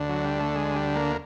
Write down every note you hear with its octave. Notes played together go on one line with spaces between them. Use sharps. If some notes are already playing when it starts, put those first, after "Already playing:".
Already playing: D2 D3
F#3
G3
A3
G#3
G3
A#3